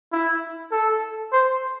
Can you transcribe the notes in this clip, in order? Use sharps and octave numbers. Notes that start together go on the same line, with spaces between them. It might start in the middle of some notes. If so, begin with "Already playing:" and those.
E4
A4
C5